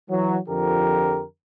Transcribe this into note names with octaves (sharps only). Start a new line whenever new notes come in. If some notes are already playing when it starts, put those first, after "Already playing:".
E3 F#3
F2 D3 F3 G4 A#4